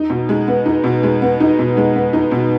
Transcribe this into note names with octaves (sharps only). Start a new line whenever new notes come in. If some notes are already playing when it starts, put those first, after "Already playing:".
Already playing: D#4
B2
G#3
B3
D#4
B2
G#3
B3
D#4
B2
G#3
B3
D#4
B2